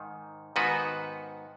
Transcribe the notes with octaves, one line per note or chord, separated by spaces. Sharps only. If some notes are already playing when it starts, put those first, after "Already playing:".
Already playing: G#2 D#3
G#2 D#3 B3 F#4 B4